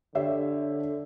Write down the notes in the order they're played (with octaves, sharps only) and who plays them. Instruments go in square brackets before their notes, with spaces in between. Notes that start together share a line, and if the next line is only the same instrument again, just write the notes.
[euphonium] D3 [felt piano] G4 C#5 E5